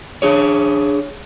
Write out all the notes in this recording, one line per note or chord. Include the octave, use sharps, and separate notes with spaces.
D4 G#4 C#5